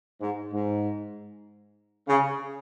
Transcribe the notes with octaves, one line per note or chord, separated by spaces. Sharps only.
G#2
G#2
C#3